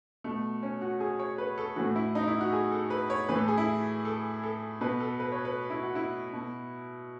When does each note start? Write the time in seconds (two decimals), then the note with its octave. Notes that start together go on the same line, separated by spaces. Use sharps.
0.24 B2 A3
0.63 C#4
0.81 F#4
1.00 G#4
1.19 C#5
1.38 B4
1.58 A4
1.76 A2 E3 F#4
1.96 E4
2.15 D#4
2.27 E4
2.41 F#4
2.53 G#4
2.72 A4
2.90 B4
3.10 C#5
3.29 A2 E3 B4
3.38 A4
3.48 G#4
3.58 E4
4.05 A4
4.44 A4
4.81 B2 B4
5.00 A4
5.20 B4
5.32 C#5
5.45 B4
5.70 E4
5.83 F#4
5.95 E4
6.33 B2